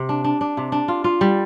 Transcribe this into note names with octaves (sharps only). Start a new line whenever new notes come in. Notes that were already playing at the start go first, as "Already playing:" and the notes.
Already playing: C3
D4
D4
D4
C3
D4
F4
F4
G3